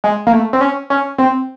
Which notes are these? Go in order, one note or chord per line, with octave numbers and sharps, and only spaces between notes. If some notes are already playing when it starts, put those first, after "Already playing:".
G#3
A#3
A3
C4
C#4
C#4
C4